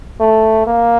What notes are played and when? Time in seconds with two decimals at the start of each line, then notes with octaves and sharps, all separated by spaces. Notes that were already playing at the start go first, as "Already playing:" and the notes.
0.20 A3
0.67 A#3